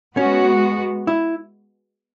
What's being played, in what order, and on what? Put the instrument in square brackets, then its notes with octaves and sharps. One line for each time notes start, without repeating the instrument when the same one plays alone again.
[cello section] G#3 B3 F#4 [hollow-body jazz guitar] C#4
[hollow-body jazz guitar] E4